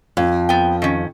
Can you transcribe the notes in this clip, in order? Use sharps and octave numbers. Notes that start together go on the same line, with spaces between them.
F2
B3 G5
D#3 C#4